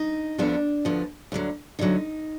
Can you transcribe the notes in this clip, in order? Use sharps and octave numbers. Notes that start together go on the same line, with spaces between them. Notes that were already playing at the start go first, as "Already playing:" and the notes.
Already playing: D#4
D2 D3 F3 B3 D4
D2 D3 F3 B3
D2 D3 F#3
D2 D3 F#3 D#4